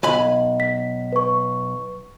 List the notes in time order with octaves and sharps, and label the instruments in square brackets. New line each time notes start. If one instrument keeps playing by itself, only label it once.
[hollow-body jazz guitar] B1 G#5 B5
[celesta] B6
B4 C#6